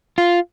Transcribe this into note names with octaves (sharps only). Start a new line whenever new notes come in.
F4